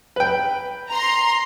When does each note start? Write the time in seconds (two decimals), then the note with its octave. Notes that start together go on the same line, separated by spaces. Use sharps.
0.16 B4 G5
0.90 A#5 C6